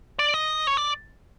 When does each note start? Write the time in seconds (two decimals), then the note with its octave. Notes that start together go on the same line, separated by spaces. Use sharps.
0.19 D5
0.34 D#5
0.67 C#5
0.77 D5